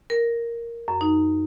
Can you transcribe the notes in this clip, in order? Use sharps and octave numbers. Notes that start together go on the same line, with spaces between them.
A#4
F#2
D#4